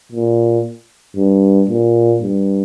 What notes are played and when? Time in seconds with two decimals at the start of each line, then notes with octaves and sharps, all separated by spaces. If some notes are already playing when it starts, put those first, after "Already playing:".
0.12 A#2
1.17 G2
1.69 A#2
2.22 G2